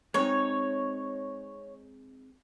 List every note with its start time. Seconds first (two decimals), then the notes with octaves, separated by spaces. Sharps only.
0.14 G#3 C4 D#4 C#5